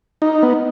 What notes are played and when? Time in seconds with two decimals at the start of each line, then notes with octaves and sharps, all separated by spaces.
0.22 D#4
0.43 B3